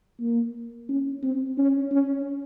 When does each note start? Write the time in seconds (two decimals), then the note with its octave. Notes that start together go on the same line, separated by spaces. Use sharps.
0.21 A#3
0.89 C#4
1.23 C4
1.58 C#4
1.91 C#4